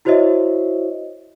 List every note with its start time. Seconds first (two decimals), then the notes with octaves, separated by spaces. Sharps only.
0.05 E4 F#4 C5 C#5 D#5 E5